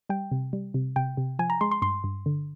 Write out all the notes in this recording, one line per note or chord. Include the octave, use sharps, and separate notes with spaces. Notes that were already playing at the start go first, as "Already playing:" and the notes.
G3 G5
C3
G3
C3
C3 G5
C3
F3 G#5
A#5
G#3 C6
C6
G2 C6
G2
D3